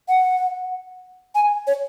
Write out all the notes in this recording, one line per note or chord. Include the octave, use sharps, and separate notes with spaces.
F#5
G#5
C#5